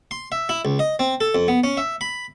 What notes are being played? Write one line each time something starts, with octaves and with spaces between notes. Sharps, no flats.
C6
E5
E4
C#2
D#5
C4
A4
F2
B3
C#4
E5
B5